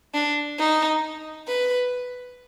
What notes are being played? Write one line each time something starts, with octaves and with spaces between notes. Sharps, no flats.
D4
D#4
B4